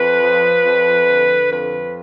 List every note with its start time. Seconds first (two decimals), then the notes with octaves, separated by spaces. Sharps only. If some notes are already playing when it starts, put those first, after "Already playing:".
Already playing: F2 B4
0.21 F3
0.64 F2
1.08 D3
1.51 F2 B4